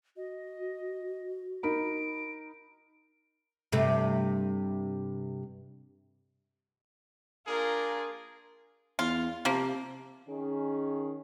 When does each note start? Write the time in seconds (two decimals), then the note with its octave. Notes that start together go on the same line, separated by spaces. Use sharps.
0.17 F#4 D#5
1.63 D#4 A#4 B5 D7
3.72 G2 C3 A3
7.47 A#3 D4 F4 G#4 A#4
8.99 E2 F4
9.45 C3 F3 A#3
10.29 D#3 C#4 G#4